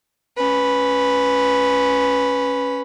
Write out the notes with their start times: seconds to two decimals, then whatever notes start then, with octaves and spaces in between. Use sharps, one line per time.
0.37 C#4 B4